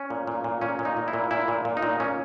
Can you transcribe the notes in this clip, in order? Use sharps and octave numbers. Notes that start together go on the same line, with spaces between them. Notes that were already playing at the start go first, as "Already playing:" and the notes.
Already playing: C#4
A#2
A#2
A#2
A#2 C#4
A#2
D#4
A#2
E4
A#2
A#2 E4
A#2
A#2
D#4
A#2
A#2 C#4